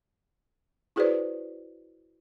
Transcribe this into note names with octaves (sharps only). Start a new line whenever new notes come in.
E4 F#4 G#4 B4 C5 D5